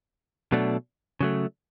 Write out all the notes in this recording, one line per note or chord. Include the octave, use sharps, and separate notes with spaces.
B2 F#3 A3 D4
C#3 F#3 A3